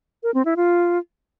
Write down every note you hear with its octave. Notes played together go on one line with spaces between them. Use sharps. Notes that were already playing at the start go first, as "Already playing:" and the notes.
A#4
C4
E4
F4